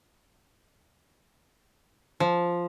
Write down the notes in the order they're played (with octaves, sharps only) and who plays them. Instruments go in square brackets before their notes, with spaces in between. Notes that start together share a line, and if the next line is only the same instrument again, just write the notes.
[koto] F3